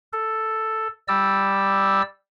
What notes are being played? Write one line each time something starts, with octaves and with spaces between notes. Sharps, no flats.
A4
G3 D5 E6